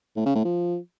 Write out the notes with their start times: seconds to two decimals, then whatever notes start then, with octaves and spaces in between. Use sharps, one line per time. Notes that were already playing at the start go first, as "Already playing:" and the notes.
0.16 A2
0.26 C#3
0.35 A2
0.45 F3